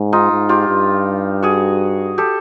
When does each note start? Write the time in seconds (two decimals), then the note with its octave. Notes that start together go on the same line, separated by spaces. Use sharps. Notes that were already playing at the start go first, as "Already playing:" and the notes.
Already playing: G#2
0.13 D#4 F4
0.32 G#2
0.49 F4 G4
0.68 G2
1.43 F#4 G#4
2.18 G4 A4